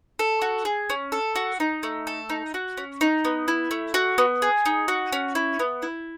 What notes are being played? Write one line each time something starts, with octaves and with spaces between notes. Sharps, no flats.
A4
F#4
G#4
C#4
A4
F#4
D#4
A3
A4
D#4
F#4
C#4
D#4
B3
E4
A3
F#4
B3
G#4
D#4
F#4
C#4
E4
B3
E4